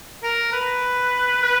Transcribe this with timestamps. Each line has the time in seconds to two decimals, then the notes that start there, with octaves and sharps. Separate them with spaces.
0.23 A#4
0.53 B4
1.43 B4